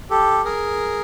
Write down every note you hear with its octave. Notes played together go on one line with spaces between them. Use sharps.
G4 A4
G#4 A#4